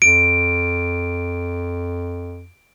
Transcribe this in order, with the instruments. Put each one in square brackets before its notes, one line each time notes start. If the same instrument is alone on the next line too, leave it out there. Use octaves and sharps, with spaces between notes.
[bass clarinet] F2 [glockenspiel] D7